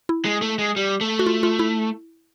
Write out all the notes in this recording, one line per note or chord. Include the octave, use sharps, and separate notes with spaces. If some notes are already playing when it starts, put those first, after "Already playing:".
E4
G#3
A3
G#3
G3
A3
F#4
F4
F4
E4